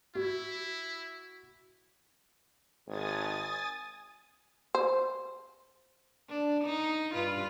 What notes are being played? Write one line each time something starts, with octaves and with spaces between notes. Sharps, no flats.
E4 F#4
G#1 G#5 D#6 A6
C5
D4
D#4
G2 F4 B4